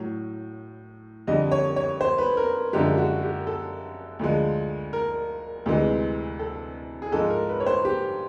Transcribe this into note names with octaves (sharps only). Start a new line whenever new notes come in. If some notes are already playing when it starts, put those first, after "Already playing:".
Already playing: A2 F#3
F2 D3 G3 D#5
C#5
C#5
C5
B4
A#4
F#2 D3 F3 G#3 G4
F#4
G4
A4
D2 D3 F3 G#3
A#4
D2 C3 E3 G#3
A4
G#4
G#2 F3 G#3 A4
A#4
B4
C#5
C5
G4